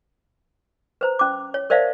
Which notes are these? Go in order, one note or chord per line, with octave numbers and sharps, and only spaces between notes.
B4 C5 A#5
C#4 D6
C#5
A#4 C5 D5 E5 F5 A5